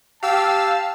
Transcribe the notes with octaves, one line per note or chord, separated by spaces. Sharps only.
G4 F5 A5 E6